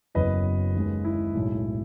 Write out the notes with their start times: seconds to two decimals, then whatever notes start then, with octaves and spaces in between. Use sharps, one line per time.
0.15 F#1 F#2 E3 B3 B4 D#5
0.75 D#2 C#3 G#3
1.04 E4
1.35 B1 A2 G#3